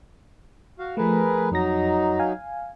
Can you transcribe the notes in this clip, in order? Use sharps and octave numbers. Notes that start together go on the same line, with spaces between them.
F#4 F5
F3 A3 G#4 A#4 B4
F2 F#3 D#4 A#6
F5 G#5